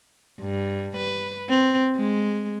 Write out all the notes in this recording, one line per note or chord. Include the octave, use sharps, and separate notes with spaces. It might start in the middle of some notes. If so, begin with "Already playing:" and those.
G2
B4
C4
G#3